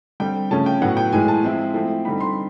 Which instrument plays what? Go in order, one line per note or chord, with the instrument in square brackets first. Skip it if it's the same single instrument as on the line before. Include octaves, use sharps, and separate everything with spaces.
[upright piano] D3 G3 C4 G5
C#3 F3 A3 C#4 A5
G5
A2 F#3 B3 F#5
G5
A2 E3 G#3 G#5
A5
F3 G#3 C4 E4
F3 A3 C4 E4
D3 G3 C4 D#4 B5
C6